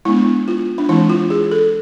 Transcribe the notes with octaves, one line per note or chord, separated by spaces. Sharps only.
G#3 B3 D4 E4
F4
D4
E3 G#3 C4 E4
F4
G#4
A4